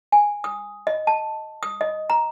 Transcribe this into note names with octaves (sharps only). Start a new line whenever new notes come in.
G#5
D#6
D#5
A5
D#6
D#5
A#5